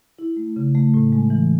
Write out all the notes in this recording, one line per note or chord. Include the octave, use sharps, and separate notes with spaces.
E4
A3
C#3
A3
A2
G#3
E3